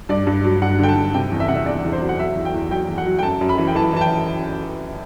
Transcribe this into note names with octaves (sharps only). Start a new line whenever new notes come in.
G2 D5
G2
F#3
G2 F#5
D3 G5
A5
G2
C3 G5
E2
E5
C3 F#5
E5
E2 D5
E2
C5
F#3
F#5
F#3 E5
E2
G5
E2
F#3 G5
E2
F#5
F#3
G5
F#2 A5
F#2
B5
E3
G5
E3 A5
E3 A5
G5